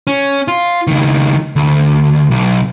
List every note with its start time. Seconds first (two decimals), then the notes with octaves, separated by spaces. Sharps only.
0.07 C#4
0.48 F4
0.87 C#2 D#3
1.56 D2
2.31 B1